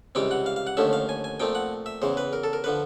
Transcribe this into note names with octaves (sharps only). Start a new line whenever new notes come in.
C#2 C3 E3 G3 C4 G5
F#5
F5
F5
F#5
D#2 D3 F3 A3 C#4 E5
F5
G#5
G#5
A#2 F3 A3 C4 G5
F#5
E5
E2 C#3 E3 C5
B4
A#4
A4
A#4
D3 F3 B4